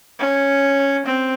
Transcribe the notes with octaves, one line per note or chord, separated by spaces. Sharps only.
C#4
C4